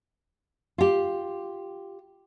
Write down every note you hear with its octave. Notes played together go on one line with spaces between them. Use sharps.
F4 G4